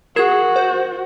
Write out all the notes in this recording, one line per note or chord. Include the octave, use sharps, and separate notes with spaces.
F#4 G#4 A#4 G#6
C5